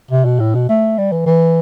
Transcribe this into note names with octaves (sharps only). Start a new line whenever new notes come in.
C3
B2
A2
B2
A3
G3
E3
E3